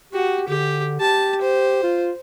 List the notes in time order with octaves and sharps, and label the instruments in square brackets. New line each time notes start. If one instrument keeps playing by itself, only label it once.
[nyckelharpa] F#4 [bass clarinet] G4
[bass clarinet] D3 [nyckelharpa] G4
[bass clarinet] G4 [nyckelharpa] A5
[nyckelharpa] C5
[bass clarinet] F4